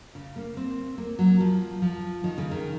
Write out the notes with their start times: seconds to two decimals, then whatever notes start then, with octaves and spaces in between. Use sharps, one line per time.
0.15 C#3
0.36 A#3
0.57 C4
0.98 A#3
1.19 F#3
1.41 F3
1.82 F3
2.24 D#3
2.38 C#3
2.51 D#3